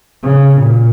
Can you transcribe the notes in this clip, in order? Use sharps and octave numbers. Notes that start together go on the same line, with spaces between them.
C#3
A#2